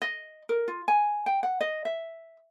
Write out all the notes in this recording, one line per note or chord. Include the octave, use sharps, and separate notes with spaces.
D#5
A#4
F4
G#5
G5
F#5
D#5
E5